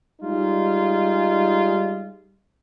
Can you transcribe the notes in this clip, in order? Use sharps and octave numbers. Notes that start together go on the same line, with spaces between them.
G3 G#3 D#4 F4